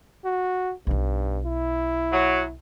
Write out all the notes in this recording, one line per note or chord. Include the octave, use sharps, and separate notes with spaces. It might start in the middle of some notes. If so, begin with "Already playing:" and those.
F#4
B1 G2 D#4
E4
F#3